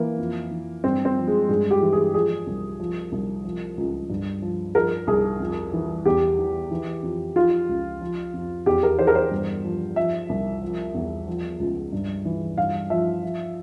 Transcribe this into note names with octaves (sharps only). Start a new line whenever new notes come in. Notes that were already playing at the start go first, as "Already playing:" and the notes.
Already playing: E3 A#3
F2
E3
G2 C4
C4
F3
G#3
G2 G#3
G4
E3
G#4
F3 G#4
C2
F3
C2
F3
C#2
G2
F3
F3 A#4
C2 G#4
F2
E3
E2 G4
E3
E3
F2
F3 F4
C#2
F3
F2
E2 G4
A#4
E3 C5
A#4
C5
G2
F3
F3 E5
C2
F3
E2
F3
C#2
G2
E3
G2 F5
F3 E5
F3